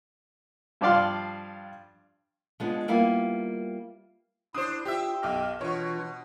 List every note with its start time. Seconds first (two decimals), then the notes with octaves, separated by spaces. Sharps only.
0.81 G2 F3 D4 D5 F5 C6
2.60 F3 G#3 B3 D4
2.88 G3 A#3 B3 E4 F4
4.54 D4 E4 C5 D#6
4.85 F4 G4 E5
5.23 B1 D#5 D6 F6
5.61 B2 E3 D4 F4 C#5 C#6